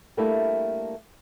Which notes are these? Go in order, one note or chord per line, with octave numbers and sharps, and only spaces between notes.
G3 A3 A#3 D4 E4 G4